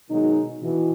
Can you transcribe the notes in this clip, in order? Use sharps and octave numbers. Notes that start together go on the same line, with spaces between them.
B2 D#3 F#3 G#3 D#4
B2 E3